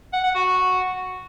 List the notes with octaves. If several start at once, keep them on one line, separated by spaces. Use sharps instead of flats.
F#5
F#5
F#4